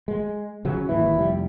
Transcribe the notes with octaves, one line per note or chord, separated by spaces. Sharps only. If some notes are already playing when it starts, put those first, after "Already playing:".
G#3
C#3 F#3 C#4
G#1 D#2 E3 E4
F1 G3